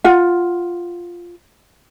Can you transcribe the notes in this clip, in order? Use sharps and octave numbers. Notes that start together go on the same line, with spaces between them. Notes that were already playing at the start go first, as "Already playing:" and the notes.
F4 F#5